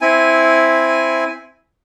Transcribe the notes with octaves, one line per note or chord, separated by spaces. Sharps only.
C4 E4 G#5